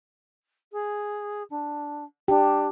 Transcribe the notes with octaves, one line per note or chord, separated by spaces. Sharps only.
G#4
D4
D4 G4